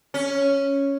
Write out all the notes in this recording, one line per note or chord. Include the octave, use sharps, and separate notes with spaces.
C#4